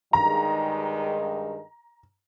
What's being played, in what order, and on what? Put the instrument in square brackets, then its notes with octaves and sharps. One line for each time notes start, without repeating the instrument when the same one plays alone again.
[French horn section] G2 D#3 G#3 [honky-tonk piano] A#5